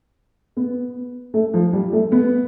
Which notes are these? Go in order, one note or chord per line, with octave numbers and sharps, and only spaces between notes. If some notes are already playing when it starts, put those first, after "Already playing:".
B3
A3
F3
G3
A3
B3